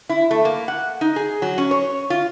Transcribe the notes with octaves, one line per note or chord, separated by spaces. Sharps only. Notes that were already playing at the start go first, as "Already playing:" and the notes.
E4
A3
A#3
F#5
D#4
G#4
F#3
C#4
C#5
F4